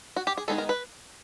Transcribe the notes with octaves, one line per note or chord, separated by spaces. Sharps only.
F#4
G4
G#4
D#3 G#3 B3 D#4 A4
A#4
B4